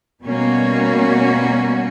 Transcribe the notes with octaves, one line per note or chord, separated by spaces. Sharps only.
B2 G3 A#3 C#4 F#4